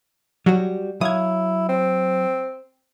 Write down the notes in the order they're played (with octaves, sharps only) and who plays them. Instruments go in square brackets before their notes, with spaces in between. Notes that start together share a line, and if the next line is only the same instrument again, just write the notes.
[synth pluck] F#3 [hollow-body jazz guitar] G3 F#4
[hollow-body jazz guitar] F#3 F5 [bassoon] E4 [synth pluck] D#6 G#6
[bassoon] C4